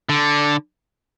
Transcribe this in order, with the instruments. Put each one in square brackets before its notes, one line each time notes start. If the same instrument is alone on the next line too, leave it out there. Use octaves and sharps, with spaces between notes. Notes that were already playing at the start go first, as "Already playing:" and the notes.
[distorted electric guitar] D3